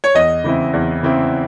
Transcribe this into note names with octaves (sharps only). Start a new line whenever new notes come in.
C#5
E2 D#5
C#3 E3 C4 E4
E2
C#3 E3 C4 E4